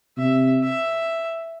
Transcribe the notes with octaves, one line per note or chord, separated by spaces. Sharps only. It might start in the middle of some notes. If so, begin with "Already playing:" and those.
C3 E5
E5